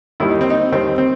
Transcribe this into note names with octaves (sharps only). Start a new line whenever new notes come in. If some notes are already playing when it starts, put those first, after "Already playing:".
D#2 D#3 G3 E4
D#4
C4
D#4
D#2 D#3 G3 C4
C4